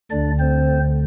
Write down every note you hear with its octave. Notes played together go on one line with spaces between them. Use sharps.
D2 D3 D4 D5
C4 C5